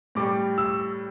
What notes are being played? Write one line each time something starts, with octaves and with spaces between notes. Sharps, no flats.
A2 G3 D6
E6